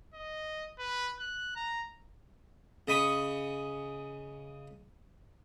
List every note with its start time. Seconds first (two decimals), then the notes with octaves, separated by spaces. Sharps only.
0.14 D#5
0.79 B4
1.20 F#6
1.56 A#5
2.88 C#3 D#5 B5 C#6 D#6